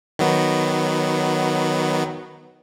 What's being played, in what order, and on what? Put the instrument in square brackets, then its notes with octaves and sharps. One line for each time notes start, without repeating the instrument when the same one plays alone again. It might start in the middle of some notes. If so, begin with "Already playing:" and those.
[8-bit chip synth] D#3 F#3 B3